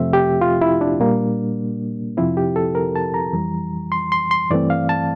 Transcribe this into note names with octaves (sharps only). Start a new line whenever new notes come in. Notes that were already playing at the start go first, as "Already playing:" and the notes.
Already playing: F2 C3 F3 A3 C4 E5
G4
F4
E4
D4
A#2 G3 A#3
F2 C3 F3 C4 E4
G4
A4
A#4
A5
A#5
F2 E3 G3
C6
C6
C6
G2 E3 A3 C4 D5
F5
A5